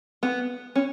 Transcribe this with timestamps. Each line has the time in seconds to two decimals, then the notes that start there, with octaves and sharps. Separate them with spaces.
0.23 B3
0.76 C#4